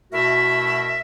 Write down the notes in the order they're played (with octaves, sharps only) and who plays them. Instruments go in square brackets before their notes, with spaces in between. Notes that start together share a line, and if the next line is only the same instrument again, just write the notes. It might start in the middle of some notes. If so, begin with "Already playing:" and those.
[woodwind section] B2 A3 E4 F#4 A#4 E5